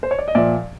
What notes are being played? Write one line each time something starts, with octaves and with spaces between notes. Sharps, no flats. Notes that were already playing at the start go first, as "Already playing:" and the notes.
C5
C#5
D5
D#5
A#2 F3 D5 E5